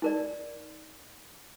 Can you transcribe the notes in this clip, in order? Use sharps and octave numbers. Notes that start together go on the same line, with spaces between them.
D#4 A#4 D5